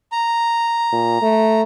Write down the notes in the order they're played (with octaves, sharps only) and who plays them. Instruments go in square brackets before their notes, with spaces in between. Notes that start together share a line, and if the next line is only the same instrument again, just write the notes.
[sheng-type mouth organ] A#5
[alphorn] A#2
A3